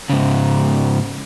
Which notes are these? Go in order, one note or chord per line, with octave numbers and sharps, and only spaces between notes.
G#2 C#3